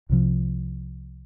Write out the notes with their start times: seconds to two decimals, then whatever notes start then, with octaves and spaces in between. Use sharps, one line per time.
0.09 C2 C3 F3